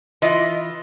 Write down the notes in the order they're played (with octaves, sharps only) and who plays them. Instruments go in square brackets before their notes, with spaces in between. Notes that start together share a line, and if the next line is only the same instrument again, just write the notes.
[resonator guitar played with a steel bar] E3 F4 D#5